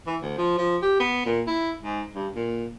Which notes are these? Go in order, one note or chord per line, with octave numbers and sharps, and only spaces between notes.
E3
D2
F3
F3
G4
B3
A#2
E4
G#2
G2
A#2